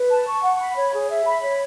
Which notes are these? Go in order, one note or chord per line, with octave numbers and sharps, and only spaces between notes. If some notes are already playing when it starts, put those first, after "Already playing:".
Already playing: B4
A5
C#6
F#5
B5
C#5
G#4
E5
B5
C#5